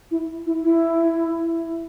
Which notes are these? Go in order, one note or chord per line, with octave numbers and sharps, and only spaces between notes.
E4
E4
E4